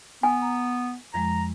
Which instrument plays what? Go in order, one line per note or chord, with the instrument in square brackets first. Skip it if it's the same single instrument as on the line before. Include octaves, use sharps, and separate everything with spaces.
[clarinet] B3 [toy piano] G#5
[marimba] A#5
[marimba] F2 F3 G#3 [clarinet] A#5